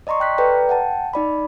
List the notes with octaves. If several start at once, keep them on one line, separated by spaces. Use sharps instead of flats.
D5 D#5 A#5 C6 C#6
G5 F#6 B6
A4 B4 D5 G5 A#5
F#5 G5 A5
D#4 D5 B5